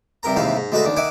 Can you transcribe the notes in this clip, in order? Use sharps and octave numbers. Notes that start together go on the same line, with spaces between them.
G2 C3 A#4 A#5
D#2 G#2 C3 E3 F5
G#2
D2 G#3 A3 F#4 A4 B4
D#2 D4
D#3 E5 F#5 G#5 D6